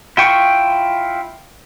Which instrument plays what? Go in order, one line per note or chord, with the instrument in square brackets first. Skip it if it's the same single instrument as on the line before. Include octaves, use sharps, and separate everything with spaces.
[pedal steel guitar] E4 F4 G5 C#6